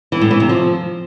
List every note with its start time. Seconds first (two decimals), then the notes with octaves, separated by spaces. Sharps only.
0.12 E3
0.21 A2
0.31 E3
0.40 C3
0.49 F3